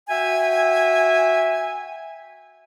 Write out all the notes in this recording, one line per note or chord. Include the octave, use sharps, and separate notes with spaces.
F#4 E5 G5 G#5